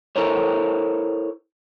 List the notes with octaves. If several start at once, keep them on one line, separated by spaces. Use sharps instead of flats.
E4 A4 A#4 C5 C#5